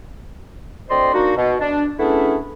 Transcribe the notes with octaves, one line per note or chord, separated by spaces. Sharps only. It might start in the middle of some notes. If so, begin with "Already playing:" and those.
D2 C4 C5 D5 D#5 C6
A#3 D4 D#4 F#4
B2
D4
A3 B3 C#4 D4 E4 G#4